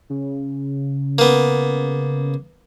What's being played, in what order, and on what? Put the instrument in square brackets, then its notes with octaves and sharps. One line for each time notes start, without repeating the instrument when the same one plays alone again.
[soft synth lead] C#3
[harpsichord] A#3 B3